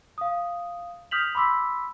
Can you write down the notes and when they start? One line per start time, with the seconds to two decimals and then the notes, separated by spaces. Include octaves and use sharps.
0.18 F5 D#6
1.11 D#6 F6 G6 B6 F7 F#7
1.35 B5 C6 D6 E6 B6